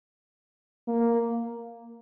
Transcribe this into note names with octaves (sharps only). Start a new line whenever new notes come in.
A#3